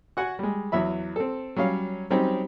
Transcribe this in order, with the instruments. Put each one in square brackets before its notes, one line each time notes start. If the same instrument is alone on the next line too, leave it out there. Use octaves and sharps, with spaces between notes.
[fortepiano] F#4 F#5 G#5
G3 G#3
E2 F#3 E5 B5
C4 A4
F#3 G3 C#4 F5
F#3 G3 C4 C#4 D#4 G4